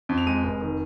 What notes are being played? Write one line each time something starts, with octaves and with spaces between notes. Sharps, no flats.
F2
F7
G#3 D#7
F1
D#3